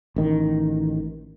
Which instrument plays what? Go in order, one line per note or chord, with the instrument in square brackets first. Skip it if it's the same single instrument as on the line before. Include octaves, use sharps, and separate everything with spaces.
[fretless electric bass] A1 D#3